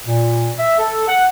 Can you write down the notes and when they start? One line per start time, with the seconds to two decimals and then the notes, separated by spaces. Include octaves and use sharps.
0.06 A#2
0.59 E5
0.79 A4
1.08 F#5